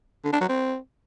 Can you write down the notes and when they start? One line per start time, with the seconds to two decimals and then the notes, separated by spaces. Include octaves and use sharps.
0.24 D3
0.33 D4
0.41 F#3
0.49 C4